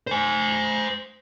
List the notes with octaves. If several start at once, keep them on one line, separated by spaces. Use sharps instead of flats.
C5 G#5